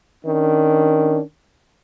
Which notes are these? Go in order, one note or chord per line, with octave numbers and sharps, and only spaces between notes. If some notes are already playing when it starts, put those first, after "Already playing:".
D#3 C#4 D4